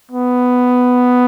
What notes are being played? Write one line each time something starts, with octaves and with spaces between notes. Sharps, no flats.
B3